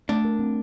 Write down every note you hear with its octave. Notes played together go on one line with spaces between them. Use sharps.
A3 D4
A#4
C4